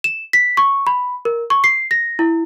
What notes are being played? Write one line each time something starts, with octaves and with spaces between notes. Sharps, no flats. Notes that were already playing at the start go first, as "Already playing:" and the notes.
E7
B6
C#6
B5
A#4
C#6
C7
A#6
E4